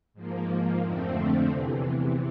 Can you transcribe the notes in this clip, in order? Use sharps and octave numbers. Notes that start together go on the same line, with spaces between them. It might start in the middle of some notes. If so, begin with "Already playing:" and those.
G#2 F3 A#3
F2 D3 F3 A3 C4
E2 C3 E3